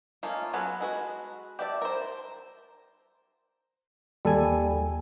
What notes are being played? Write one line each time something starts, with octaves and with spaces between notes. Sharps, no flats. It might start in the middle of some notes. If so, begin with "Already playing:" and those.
A3 A#3 C#4 D#4 F4
F#3 B3 C#4 A4 B4
G#3 F#4 B4
G4 D5 E5 F#5 A5
A#4 C5
D#2 G3 A4 G#5